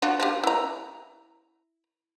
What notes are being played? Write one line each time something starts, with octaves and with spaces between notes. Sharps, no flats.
D4 F4 F#4
F3 G4
E4 A#5